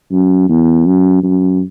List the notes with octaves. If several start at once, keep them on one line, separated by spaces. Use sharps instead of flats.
F#2
E2
F#2
F#2